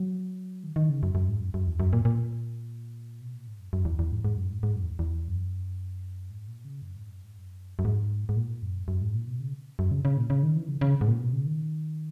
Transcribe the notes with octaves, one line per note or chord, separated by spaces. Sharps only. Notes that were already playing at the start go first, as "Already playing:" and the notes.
Already playing: F#3
D#3
D#3
C#3
F#2
F#2
G#2
F#2
F#2
E2
F#2
A#2
A#2
B2
A#2
G#2
F#2
F#2
E2
E2
G#2
G#2
F#2
G#2
G#2
F#2
E2
E2
F#2
G#2
A#2
C#3
F#2
G#2
F#2
G#2
F#2
F#2
G#2
G#2
A#2
F#2
F#2
G#2
A#2
B2
C#3
F#2
C#3
C#3
A#2
C#3
D#3
E3
C#3
C#3
G#2
A#2
B2
C#3
D#3